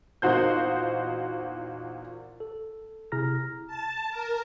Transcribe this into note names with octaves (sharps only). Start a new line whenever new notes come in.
E2 A#2 D#4 F#4 C5 G6
A4
C3 E4 G#4 A#5 F6 A#6
A5
A#4